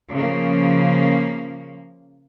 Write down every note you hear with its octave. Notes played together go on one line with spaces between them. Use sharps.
C#3 F3 A#3